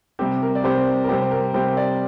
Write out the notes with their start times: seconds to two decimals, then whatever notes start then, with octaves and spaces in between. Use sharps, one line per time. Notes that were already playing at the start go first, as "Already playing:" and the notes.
0.19 C3 G3 C4 G4
0.42 A#4
0.55 D5
0.64 C3 G3 C4 G4 C5
1.04 A#4
1.09 C3 G3 C4 G4 C5
1.21 C5
1.31 A#4
1.54 C3 G3 C4 G4 C5
1.76 A#4 D5